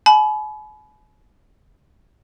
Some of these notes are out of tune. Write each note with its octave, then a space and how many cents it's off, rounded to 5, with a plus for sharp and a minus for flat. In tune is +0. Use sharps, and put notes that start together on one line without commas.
G#5 +45 B5 +0